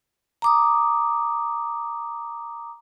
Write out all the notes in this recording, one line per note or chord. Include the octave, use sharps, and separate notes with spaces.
A#5 D6 D#6